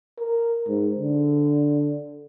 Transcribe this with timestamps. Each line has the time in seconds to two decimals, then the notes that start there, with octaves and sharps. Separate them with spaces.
0.18 A#4
0.68 G#2
0.99 D3